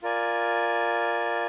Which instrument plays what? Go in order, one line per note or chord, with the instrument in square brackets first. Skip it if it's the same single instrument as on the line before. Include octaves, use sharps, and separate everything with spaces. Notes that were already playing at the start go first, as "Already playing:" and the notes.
[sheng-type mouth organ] F4 A#4 D5 G#5